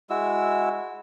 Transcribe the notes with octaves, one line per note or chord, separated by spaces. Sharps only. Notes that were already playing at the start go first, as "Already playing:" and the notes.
G#3 E4 F#4 E6